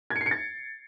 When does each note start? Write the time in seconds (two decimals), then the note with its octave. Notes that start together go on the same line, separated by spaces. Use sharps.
0.10 G#6
0.16 C#7
0.21 C7
0.26 C#7
0.31 A6